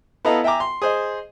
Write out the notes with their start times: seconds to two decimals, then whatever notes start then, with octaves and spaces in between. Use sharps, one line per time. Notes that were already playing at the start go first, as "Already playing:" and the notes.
0.25 B3 E4 A4 D#5 F5 A#5
0.44 E5 G5 G#5 A#5 D6
0.60 C6
0.82 G#4 C5 D#5